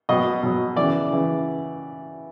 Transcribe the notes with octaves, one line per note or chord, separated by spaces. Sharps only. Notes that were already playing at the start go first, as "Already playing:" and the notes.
B2 F#3 D#5
B2 F#3
C#3 E3 D5
C#3 E3